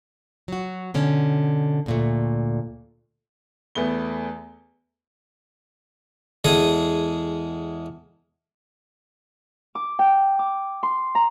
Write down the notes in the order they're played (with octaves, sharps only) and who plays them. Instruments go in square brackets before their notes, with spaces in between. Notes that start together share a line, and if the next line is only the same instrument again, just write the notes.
[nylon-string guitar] F#3 F#4
B2 D3 C#4
D2 A#2 A3
[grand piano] E2 A3 B3 G7
[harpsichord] E2 G#3 G#4 A4 D#6
[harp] D6
G5
D6
C6
A#5